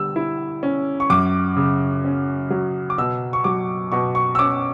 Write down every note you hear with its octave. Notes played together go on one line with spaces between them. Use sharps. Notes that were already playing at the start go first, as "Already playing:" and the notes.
Already playing: D3 G3 E6
E4
C#4
C#6
F#2 D6
C#3
C#4
F#3
D6
B2 E6
C#6
F#3 D6
B2 C#6
C#6
E6
C#4 D6